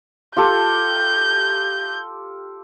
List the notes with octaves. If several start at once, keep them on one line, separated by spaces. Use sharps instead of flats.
F4 G4 A4 G6